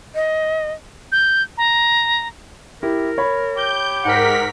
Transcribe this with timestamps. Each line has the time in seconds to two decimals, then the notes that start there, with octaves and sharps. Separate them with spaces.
0.15 D#5
1.12 G6
1.58 A#5
2.83 E4 G4 A#4
3.18 C#5 B5
3.57 G4 G6
4.04 G#2 A#4 F#5 B6